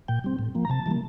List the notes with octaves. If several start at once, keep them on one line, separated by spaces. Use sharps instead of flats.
A#2 G5
G3 C4
A2
F3 A#3
A#5
C3 A5
E3 G3 A#3